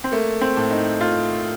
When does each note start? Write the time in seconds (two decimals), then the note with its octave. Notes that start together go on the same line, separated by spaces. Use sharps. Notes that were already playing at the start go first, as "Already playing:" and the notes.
0.04 C4
0.12 A3 A#3
0.41 C4
0.57 A2
0.70 D#4
1.00 A3 F4